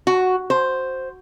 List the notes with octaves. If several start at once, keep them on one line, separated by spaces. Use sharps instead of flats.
F#4
C5